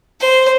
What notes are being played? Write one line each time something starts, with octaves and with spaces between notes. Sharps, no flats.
C5